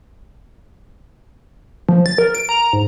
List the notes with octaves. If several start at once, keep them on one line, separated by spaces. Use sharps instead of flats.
F3
A6
A#4
D7
A#5
G#2